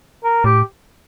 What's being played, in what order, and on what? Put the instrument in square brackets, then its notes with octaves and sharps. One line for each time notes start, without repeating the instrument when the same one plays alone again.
[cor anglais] A#4
[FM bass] A2 [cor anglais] G4